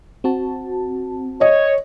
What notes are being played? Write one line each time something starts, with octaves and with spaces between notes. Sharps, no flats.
C4 F#4 A5
C#5 D#5